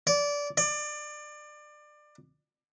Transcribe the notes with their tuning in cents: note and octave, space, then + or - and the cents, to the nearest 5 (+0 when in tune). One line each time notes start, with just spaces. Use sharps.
D5 -20
D5 +25